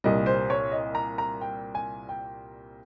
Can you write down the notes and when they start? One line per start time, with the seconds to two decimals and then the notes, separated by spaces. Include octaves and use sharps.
0.04 C2 A#2 G3 D#5
0.26 C5
0.50 C#5
0.72 D#5
0.95 A#5
1.18 A#5
1.41 G5
1.75 G#5
2.09 G5